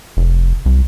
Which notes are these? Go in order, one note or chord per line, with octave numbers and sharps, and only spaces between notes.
F1
C2